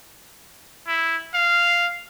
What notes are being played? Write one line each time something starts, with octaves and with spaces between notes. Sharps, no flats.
E4
F5